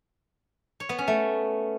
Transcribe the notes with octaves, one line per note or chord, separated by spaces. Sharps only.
C#5
B3
C#4
A3